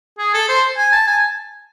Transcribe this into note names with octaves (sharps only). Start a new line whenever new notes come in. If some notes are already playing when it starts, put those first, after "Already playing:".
G#4
A4
C5
G#5
A5
G#5